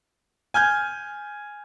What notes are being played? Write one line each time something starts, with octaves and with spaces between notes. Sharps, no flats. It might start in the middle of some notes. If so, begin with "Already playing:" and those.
G#5 F6 G6 G#6